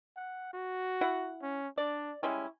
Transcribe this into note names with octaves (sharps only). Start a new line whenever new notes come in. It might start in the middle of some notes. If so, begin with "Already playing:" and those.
F#5
F#4
E4 F#5
C#4
D4 D5
G3 G#3 C#4 E4